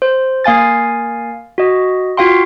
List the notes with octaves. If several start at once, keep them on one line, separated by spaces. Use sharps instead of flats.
C5
A#3 F5 G#5 A6
F#4 D#5
F4 F#4 F5 G5 C6